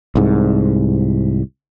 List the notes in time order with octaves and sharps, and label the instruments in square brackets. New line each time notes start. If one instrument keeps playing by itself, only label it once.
[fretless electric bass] C2 G#2